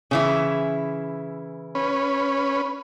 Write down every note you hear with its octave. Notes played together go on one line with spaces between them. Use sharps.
C#3 E3 E4
C#4 B4